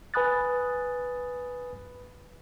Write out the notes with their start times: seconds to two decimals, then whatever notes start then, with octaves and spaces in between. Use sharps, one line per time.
0.14 B4 G#5 B5 D#6 F#6 A6